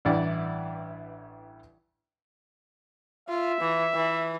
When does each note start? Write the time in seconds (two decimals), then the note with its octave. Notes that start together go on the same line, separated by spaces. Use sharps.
0.05 A1 G2 E3 E4 D5 F#5
3.29 F4 E5
3.60 E3
3.94 E3